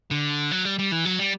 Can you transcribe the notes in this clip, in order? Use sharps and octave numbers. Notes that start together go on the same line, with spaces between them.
D3
F#3
G3
G3
E3
F#3
G3